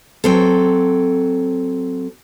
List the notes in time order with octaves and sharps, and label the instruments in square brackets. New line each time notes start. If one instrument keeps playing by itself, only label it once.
[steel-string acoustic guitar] F#3 C4 A4